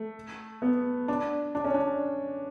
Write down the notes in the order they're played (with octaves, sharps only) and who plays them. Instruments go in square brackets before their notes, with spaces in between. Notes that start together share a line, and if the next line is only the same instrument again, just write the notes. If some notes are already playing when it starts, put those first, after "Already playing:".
Already playing: [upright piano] A3
B3
D4
D4
C#4
D4